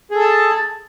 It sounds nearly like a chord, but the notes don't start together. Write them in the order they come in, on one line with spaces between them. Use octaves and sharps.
G#4 A4 A5